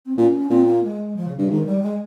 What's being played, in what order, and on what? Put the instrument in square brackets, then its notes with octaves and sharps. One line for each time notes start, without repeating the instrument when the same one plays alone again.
[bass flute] C4
[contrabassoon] A#2 [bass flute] C#4
[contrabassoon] A#2 [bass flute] C4
[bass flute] A#3
G#3
F3
C#3
[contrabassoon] G2 [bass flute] C#3
[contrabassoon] G#2 [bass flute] D#3
[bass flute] G3
G#3